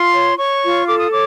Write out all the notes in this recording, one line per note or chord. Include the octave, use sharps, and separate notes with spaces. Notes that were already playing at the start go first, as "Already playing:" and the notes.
Already playing: F4 C6
C#5
C#5 C#6
F4
A4 D6
D#6
C#5 D6